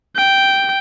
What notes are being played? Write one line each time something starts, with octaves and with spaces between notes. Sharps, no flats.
G5